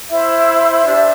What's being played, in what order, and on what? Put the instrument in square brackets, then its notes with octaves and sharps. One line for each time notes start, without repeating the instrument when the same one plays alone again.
[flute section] E4 C5 E5
D4 G4 C5